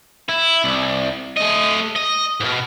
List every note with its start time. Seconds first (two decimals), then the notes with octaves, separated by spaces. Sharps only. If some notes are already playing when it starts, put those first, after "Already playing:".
0.29 E4
0.64 C2
1.37 A3 D#5
1.96 D#5
2.40 G#2 B2